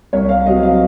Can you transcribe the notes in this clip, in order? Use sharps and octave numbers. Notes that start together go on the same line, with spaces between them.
C2 C#5
F5
C3 F#3 C4 D#5
F5